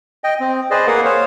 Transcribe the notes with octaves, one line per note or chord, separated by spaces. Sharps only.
D#5 G5
C4
G#4 B4 C5 D5 D#5
A#3 G#4 A#4 B4 F5 F#5
C5 C#5 F5